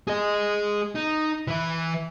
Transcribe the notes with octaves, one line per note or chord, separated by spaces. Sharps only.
G#4 D#5
D#4
E3 E4